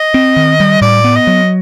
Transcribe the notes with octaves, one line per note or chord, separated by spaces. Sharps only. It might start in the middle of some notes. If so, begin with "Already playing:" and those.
Already playing: D#5
C4
D#3
G3
A2 D5
B3
D#5
F#3